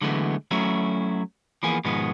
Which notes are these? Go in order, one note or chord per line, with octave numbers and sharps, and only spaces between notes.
D3 E3 F#3 G#3 A3 B3
F#3 A3 C#4 E4 F#4
E3 F3 A#3 B3 G#4
G#2 B2 D#3 F3 G#3 B3